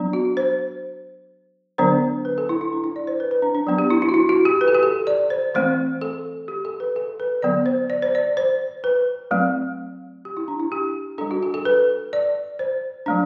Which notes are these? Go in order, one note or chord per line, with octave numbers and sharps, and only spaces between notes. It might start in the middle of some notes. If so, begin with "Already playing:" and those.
Already playing: F#3 B3 D4
F#4
C5
D3 F#3 B3 D4 C5
B4
A4
E4
E4
D4
E4
D5
C5
B4
B4
D4
D4
F#3 B3 D4
G4
E4
E4
F#4
E4
F#4
G4
B4
A4
G4
A4
D5
C5
E3 A3 C4 C5
A4
G4
A4
B4
A4
B4
D3 F#3 B3 D5
C5
D5
C5
D5
C5
B4
F#3 A3 C4
G4
E4
D4
E4
G4
G3 D4 A4
F#4
A4
A4
B4
D5
C5
F#3 A3 D4